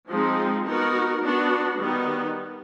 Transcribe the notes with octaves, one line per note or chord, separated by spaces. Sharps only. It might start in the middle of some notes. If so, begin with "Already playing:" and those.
F3 G#3 C4 D#4
B3 D#4 F#4 A#4
B3 D4 F#4
D#3 G3 B3 D#4